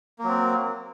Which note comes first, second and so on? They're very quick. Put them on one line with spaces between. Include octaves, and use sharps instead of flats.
A#3 F#3 C4